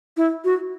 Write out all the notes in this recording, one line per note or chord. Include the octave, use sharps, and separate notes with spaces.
E4
F#4